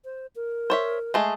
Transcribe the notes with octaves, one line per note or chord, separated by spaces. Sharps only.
C5
A#4
C5 C#5 E5
G#3 A3 G#4